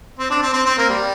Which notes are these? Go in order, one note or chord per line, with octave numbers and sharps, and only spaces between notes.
C4
D4
C4
C4
C4
A#3
G3